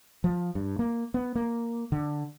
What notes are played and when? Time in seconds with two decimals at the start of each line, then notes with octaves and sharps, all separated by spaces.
0.24 F3
0.55 G2
0.79 A#3
1.14 B3
1.35 A#3
1.92 D3